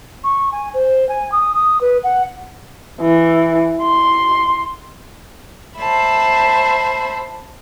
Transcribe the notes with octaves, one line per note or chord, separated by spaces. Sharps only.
C#6
G#5
C5
G#5
D#6
D#6
B4
F#5
E3
C6
C5 E5 A5 B5